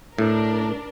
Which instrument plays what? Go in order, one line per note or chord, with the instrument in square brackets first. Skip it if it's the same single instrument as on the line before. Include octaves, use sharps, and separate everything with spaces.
[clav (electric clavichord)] A2 [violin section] D4 A#4